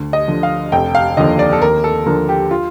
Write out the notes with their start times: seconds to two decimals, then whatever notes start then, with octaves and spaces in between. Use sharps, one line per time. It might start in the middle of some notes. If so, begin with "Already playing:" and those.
Already playing: D2
0.13 D#5
0.28 D3 F3
0.43 F5
0.72 F1 G5
0.95 F5
1.17 D#2 D3 F3 D#5
1.39 D5
1.53 A4
1.61 D#2 A#4
1.84 A4
2.06 D3 F3 A#4
2.29 G4
2.51 F4